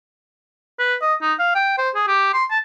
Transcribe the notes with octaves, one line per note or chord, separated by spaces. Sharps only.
B4
D#5
D#4
F5
G5
C5
G#4
G4
C6
A5